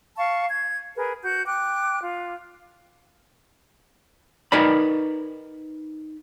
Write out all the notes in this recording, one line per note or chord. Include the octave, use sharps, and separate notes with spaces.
F5 A5 C#6
G#6
G#4 A#4 B4
F#4 G6
G5 D6 F#6
F4
D#4 A#4 B4 D5 B5